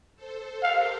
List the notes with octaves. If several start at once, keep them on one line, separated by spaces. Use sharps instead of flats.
A4 C5
G4 A#4 F5